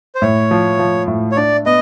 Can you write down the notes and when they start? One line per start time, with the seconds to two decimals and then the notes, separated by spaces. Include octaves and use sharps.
0.15 C5
0.22 A2 C#5
0.51 F3
0.79 F3
1.08 A2
1.32 C#5
1.37 D4 D5
1.66 B3 D#5